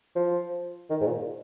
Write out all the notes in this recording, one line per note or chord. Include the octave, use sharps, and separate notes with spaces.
F3
D#3
G#2
A#2